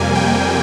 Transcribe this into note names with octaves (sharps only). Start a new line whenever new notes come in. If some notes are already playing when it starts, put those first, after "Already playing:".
Already playing: F2 C3 G3 A#3 G#5
G5